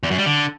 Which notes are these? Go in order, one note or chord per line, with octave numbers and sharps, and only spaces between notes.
E2
F#2
G3
D3